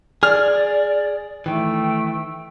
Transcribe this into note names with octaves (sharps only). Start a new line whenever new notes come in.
G#4 D5 F6
D#3 E3 A3 G5